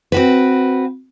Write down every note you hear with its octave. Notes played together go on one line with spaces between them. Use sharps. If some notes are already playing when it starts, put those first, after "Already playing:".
C4 F#4 B4